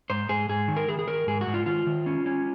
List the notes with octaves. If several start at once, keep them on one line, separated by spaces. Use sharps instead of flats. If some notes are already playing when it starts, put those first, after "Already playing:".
G#2 C5
G#2 G#4
G#2 G#4
D#3
A#4
D#3 G#4
G#4
D#3 A#4
G#2 G#4
F#4
G#2
F4
D#3 F4
D#3
C#4
C#4